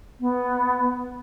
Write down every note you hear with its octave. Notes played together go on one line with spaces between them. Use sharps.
B3